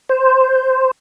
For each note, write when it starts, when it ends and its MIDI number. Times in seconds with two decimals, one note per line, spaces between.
0.09 0.91 72